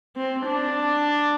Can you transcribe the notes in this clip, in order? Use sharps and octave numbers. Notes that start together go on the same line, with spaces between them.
C4
D4